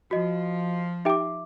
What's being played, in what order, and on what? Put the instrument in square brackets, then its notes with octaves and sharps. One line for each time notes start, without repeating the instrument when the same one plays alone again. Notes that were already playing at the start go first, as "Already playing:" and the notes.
[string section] F3 [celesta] F#4 D#5
[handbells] D#4 G4 G5 [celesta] E5 D6